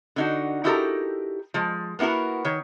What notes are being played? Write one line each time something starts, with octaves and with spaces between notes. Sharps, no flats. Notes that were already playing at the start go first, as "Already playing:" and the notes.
D3 D#4 F#4
D#4 E4 F#4 G4 A4 A#4
F3 G#3
A#3 B3 E4 F#4 A#4
D#3 C#5